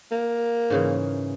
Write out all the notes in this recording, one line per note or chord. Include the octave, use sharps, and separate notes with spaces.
A#3
G#2 C#3 E3